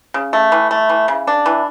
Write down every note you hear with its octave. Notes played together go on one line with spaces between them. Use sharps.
C#3
A3
E3
A3
E3
C#3
D4
E3